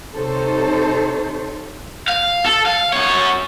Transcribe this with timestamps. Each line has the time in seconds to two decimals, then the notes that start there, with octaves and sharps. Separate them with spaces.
0.14 C3 D#4 A4 C5 C#5
2.08 F5
2.45 A4
2.66 F5
2.93 F#2 C#5